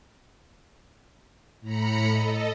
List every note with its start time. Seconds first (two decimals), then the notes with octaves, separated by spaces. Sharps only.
1.61 A2 A#5 B5 C#7
2.09 A4 D#5